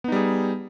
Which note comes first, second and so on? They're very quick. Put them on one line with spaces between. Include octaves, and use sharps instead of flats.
B3 D#4 G3 G#4